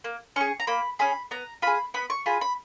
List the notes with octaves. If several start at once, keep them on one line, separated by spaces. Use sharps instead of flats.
A#3
C#4 G#4 C#6
A#5
A#3 B5
C#4 G#4 B5
B3 A#5
F4 G#4 B5
B3 B5
C#6
F4 G#4 B5
B5